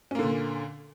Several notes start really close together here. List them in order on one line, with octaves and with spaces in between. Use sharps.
C#4 A#3 D3 A#2